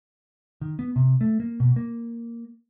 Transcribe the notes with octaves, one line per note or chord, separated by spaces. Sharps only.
D#3
B3
C3
A3
A#3
B2
A#3